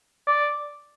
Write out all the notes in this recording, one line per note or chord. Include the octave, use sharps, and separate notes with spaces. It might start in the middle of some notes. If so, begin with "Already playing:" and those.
D5